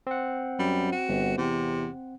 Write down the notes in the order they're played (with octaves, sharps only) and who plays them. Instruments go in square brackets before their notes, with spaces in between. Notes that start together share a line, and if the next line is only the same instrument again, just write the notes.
[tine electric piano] C4 F#5
[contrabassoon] F#2 [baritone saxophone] G3
[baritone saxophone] F#4
[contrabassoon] G1
[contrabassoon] E2 [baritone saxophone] C3